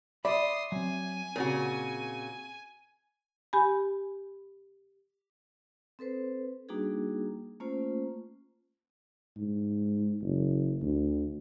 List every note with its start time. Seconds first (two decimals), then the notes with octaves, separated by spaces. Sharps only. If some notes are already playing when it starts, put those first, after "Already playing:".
0.25 D5 E5 B5 C6 D#6
0.72 F#3 C4 G#5
1.36 A#2 C#3 C4 F#4 A#4
3.53 G4 G#5 B5
5.99 C4 A4 B4 C5
6.69 G3 A#3 D4 D#4 F#4 G#4
7.60 A3 A#3 C#4 F4 C5
9.36 G#2
10.22 F#1
10.81 D2